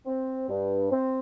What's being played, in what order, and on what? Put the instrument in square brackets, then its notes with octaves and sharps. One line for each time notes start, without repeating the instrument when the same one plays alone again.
[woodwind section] C4
G2
C4